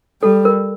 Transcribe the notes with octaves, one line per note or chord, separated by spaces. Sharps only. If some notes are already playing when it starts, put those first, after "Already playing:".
G3 A4
A#4